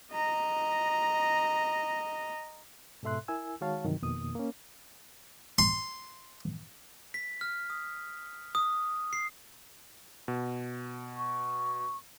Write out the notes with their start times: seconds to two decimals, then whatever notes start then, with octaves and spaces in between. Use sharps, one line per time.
0.12 D#5 A#5
3.03 G#2 B2 A4 E5 C6 F#6
3.28 E4 A#4 G#5 E6
3.61 D#3 G#3 F#4 C#5 F5 A5
3.85 G2 C3 D#3 E3 F#3
4.03 F2 B2 D#3 A#3 D#6
4.35 A#3 C#4
5.59 C6
7.14 B6
7.41 F6
7.70 D#6
8.55 D#6
9.13 C7
10.28 B2
11.17 C#6